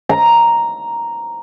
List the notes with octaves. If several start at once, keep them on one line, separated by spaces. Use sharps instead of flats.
A#5